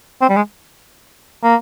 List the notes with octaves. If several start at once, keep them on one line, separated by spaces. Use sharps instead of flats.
C4
G3
G#3
A#3